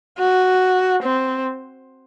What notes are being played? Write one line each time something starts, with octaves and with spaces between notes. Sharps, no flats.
F#4
C4